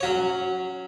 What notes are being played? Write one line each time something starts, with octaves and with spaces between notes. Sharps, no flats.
F#3 C#4 F#4 C#5